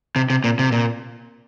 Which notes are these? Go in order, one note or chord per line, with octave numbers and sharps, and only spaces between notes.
C3
C3
A#2
C3
A#2